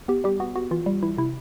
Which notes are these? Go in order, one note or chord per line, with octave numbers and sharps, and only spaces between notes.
B3 G4
G3 G4
B3 F#4
B3 F#4
E3 F4
G3
E3 E4
C3 E4